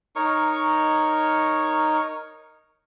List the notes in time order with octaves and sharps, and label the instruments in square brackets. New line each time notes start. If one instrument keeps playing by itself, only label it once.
[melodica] D#4 A#4 C#5 C#6